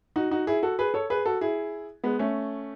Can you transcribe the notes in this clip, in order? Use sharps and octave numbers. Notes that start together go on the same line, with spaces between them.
D#4 F#4
D#4 F#4
E4 G#4
F#4 A4
G#4 B4
A4 C#5
G#4 B4
F#4 A4
E4 G#4
G#3 B3
A3 C#4